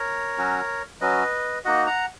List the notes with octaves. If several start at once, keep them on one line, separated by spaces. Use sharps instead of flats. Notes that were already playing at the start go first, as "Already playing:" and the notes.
Already playing: A#4 C#5
F#3 C#4 F#4
F#3 C#4 F#4 B4 D#5
A#3 D#4 F#4 D#5 F#5
F#5 A#5